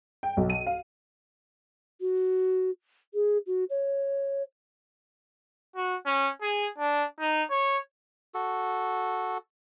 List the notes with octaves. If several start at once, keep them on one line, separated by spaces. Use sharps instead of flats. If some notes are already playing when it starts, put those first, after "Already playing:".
G5
B1
D#7
F5
F#4
G#4
F#4
C#5
F#4
C#4
G#4
D4
D#4
C#5
F#4 A4